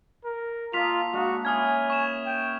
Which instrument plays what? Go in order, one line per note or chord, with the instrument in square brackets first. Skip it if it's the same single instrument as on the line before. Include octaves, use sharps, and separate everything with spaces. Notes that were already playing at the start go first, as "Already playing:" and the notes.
[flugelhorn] A#4
[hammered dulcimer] A#3 A4 D#5 [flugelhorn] F4 [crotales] B6 F7
[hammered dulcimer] G#3 A#3 D4 [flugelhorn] F#4
[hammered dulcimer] C#4 E4 F#4 [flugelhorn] G#5 [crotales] D#6 F6 G#6
[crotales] C#6 E7
[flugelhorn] G5